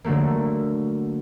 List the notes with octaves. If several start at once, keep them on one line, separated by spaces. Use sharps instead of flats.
D3 F#3 A3 A#3